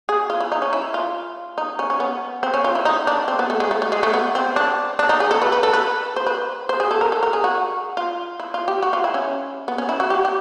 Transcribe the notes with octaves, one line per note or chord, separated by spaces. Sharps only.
G#4
F4
E4
D#4
C#4
E4
F4
D#4
C#4
C#4
B3
C4
C#4
F4
E4
D#4
D4
C4
B3
A3
G#3
A3
A3
G#3
A3
B3
C4
D4
D4
D#4
G#4
A4
B4
B4
A4
B4
C5
B4
C5
G#4
A4
A#4
A4
A#4
G#4
F#4
F4
E4
F4
G4
F#4
F4
E4
C#4
B3
C#4
E4
F#4
G4
G4